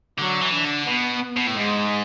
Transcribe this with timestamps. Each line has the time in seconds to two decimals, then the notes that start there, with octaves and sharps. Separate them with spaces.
0.18 D3 F#3
0.41 E3
0.53 D4
0.65 D3
0.87 B2 B3
1.37 B2
1.47 A2
1.57 G#2 G#3